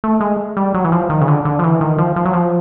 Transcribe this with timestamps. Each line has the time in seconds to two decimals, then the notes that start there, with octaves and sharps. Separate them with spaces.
0.04 A3
0.21 G#3
0.57 G3
0.74 F#3
0.84 E3
0.92 F3
1.10 D#3
1.21 C#3
1.28 D3
1.45 D3
1.59 F3
1.64 E3
1.81 D#3
1.98 F3
2.16 F3
2.25 F#3
2.33 F3